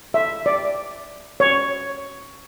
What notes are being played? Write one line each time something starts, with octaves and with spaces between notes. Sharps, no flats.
E5
D5
C#5